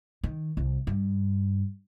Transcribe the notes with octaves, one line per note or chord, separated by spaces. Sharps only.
D#3
C2
G2